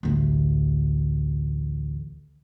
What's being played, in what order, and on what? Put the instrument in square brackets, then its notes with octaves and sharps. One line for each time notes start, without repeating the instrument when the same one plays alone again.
[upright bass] A1 D2